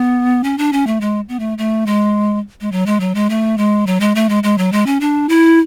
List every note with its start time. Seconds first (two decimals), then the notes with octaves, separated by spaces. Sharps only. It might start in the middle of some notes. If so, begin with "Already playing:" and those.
Already playing: B3
0.44 C#4
0.58 D4
0.73 C#4
0.87 A3
1.01 G#3
1.29 B3
1.39 A3
1.58 A3
1.86 G#3
2.61 G#3
2.72 F#3
2.86 G#3
3.00 F#3
3.15 G#3
3.30 A3
3.58 G#3
3.87 F#3
4.00 G#3
4.15 A3
4.29 G#3
4.43 G#3
4.58 F#3
4.72 G#3
4.86 C#4
5.00 D4
5.29 E4